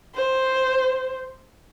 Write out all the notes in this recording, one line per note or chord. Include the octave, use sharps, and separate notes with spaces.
C5